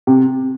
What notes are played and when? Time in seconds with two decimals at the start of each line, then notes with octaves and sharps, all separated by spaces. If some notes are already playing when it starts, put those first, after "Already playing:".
0.07 C3